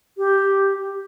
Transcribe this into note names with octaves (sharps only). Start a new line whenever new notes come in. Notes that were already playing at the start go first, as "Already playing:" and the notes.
G4